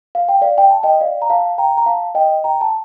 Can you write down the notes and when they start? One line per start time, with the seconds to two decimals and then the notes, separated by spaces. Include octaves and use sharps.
0.15 F5
0.28 G5
0.42 D5 F5
0.58 G5
0.71 A5
0.83 D#5 G5
1.01 D5 F5
1.22 A#5
1.29 F5 A5
1.58 G5 A#5
1.77 A#5
1.86 F5 A5
2.15 D#5 G5
2.44 G5 A#5
2.61 A5